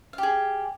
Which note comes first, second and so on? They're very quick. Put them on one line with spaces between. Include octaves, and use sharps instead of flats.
F5 G4 G#4